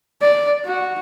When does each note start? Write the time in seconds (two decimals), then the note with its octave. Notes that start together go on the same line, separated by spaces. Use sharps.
0.21 D5
0.65 F#4